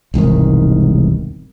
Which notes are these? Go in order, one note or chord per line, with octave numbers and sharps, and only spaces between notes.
E1 C2 G#2 D#3